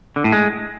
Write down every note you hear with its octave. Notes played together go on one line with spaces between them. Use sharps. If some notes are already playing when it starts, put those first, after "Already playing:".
D3
A2
G#3